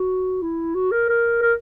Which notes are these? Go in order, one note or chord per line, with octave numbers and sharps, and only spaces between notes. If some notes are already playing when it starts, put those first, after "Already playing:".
Already playing: F#4
E4
F#4
A#4
A#4
A#4